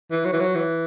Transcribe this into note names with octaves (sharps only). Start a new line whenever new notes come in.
E3
F#3
E3
F#3
E3